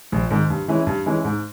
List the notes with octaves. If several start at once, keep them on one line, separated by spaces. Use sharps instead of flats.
A#1
G#2 D#3
G2
E3 G#3 C#4 E4
G2
E3 G#3 C#4 E4
G#2